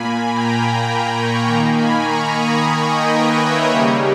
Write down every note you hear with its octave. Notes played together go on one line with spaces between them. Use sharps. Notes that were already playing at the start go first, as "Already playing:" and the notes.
Already playing: A#2 A#3 G#5 B5
G5 A#5
G5 A#5
A#5 C#6
D#3 A#3 G5 A#5
G#5 B5
A#5 C#6
B5 D#6
A#5 C#6
D#5 G5
B4 D#5
C#5 E5
C#3 G3 A#3 D#5 G5